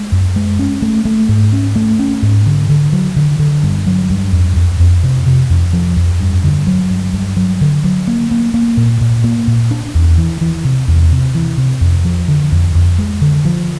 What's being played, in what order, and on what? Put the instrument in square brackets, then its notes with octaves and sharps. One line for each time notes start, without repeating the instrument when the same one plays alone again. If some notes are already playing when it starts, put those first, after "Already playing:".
Already playing: [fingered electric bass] G#3
F#2
G#3
C#4
A3
A3
G#2
C#4
A3
C#4
G#2
D3
D3
F#3
D3
D3
G2
F#3
G2
F2
F2
F2
C3
C3
F2
F3
F2
G2
D3
F#3
G2
G2
F#3
D3
F#3
A#3
A#3
A#3
A#2
A#2
A#3
A#2
D4
E2
E3
E3
C3
E2
C3
E3
C3
F2
F3
D3
F2
F2
G#3
D3
F3